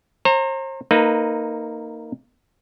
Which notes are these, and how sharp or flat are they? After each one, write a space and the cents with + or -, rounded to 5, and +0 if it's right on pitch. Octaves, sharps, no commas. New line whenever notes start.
C5 +40 A#5 -20
A#3 -20 D#4 +0 B4 +0